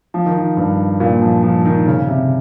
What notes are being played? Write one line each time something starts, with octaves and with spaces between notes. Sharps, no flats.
F3
D#3
F3
G2
A#2
F3
F3
D#3
C#3
C3